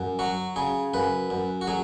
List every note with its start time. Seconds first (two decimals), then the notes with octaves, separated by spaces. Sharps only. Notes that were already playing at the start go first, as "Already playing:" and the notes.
Already playing: F#2
0.19 F#3 F#4
0.56 C#3 G#4
0.94 F#2 B4
1.30 F#2
1.61 F#4
1.67 F#3 G#4